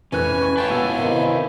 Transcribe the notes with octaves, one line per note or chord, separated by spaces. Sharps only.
F1 E3 C#4 G#5 F#6 G#6
C#6 G#6
B4 C#5 F5 G5 A5
B2 F#5 G#5 E6
C3 D#3 E4